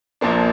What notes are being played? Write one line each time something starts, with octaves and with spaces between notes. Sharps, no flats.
A#1 A#2 F3 A#3 D4